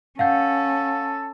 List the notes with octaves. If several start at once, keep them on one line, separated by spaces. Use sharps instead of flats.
C#4 A4 F5 F#5 G6